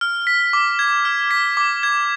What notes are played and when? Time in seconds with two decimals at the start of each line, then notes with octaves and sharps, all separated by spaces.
0.01 F6
0.27 B6
0.53 D6
0.79 G#6
1.05 F6
1.31 B6
1.57 D6
1.83 G#6